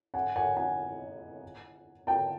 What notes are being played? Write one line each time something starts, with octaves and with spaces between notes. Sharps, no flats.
F#5 G#5
F#5 G#5
F#5 G#5
G5 A5